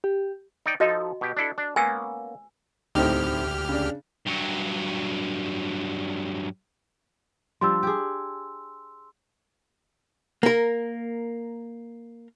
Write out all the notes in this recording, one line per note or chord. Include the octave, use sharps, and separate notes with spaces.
G4
D#4 D5 G5
F3 D#4 F#4 A4 D#5
B2 G4
D4 E4 A4
D4
A#3 B3 C#4 G#5 E6
D2 A2 C4 D#4 G4 F6
C#3 D4
G2 F#3
F3 G3 D4 C6 E6
G4 G#4
A#3 A#4